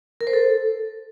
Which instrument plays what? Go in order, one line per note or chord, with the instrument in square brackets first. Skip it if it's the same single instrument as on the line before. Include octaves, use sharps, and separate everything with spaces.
[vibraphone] A#4
C5
A4